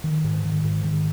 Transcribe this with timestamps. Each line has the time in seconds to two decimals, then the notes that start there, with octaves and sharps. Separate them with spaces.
0.04 D#3
0.24 G#2
0.45 D#3
0.64 G#2
0.84 D#3